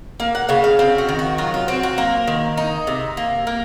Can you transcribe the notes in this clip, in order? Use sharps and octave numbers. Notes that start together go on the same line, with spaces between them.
A#3 F5
F#5
C#3 F5
F5
C4 F5
F#4
D#3
F#4
F#3 F4
F4
C4 F#4
F#4
A#3 A#4
D#3
D#4
C3
A#3
A#3